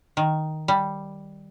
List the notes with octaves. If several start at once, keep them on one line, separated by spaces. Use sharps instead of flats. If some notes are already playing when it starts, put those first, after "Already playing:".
D#3
G3